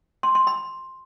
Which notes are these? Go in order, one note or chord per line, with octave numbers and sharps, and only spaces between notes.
C6
C6
B5